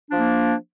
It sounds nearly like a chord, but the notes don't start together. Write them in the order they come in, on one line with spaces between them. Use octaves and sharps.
D4 F3 A#3